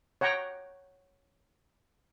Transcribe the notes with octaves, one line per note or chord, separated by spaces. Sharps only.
C#5 F#5 G5 A#5